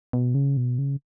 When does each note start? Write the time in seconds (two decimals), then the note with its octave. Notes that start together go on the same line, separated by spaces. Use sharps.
0.13 B2
0.34 C#3
0.57 B2
0.78 C#3